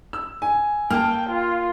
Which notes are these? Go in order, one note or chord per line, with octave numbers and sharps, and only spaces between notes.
E6
G#5
A#3 G5 A5 F6
F4